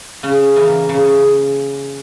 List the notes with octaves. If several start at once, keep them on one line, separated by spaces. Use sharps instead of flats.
C#3 C#4
E3 A#3
C#3